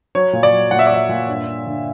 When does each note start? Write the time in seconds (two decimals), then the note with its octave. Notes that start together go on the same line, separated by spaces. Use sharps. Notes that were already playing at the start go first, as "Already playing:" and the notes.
0.15 F#3 C#5
0.33 A#2
0.43 D5
0.52 F#3
0.71 A#2 F#5
0.79 E5
0.87 D5
0.90 F#3 E5
1.09 A#2
1.28 G2
1.47 G2
1.66 D3